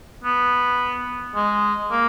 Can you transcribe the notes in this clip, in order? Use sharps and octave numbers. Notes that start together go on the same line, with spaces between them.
B3
G#3
A#3